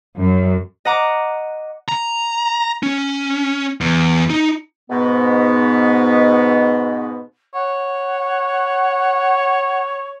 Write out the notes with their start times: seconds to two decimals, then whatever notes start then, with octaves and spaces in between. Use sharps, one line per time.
0.18 F#2
0.85 D#5 F#5 A#5 D6
1.89 A#5
2.83 C#4
3.81 E2
4.30 D#4
4.90 G#2 B2 B3
7.55 C#5 F#5